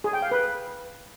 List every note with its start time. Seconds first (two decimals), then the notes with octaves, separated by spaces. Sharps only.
0.04 G#4
0.13 G5
0.22 F5
0.31 B4